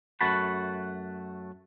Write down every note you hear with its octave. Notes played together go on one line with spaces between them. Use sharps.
F#2 A3 F#4 F#5 A5 B5